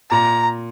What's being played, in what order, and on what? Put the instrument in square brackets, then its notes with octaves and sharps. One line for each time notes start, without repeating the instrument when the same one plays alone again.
[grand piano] A#2 [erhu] A#5